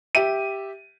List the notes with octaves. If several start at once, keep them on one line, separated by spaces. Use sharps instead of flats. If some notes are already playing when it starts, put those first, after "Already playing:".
G4 E5 D#7